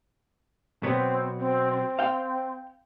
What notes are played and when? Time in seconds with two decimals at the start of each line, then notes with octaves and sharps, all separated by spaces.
0.83 B2 F#3 B3 C4
1.39 C4
1.72 C4
1.99 F5 G5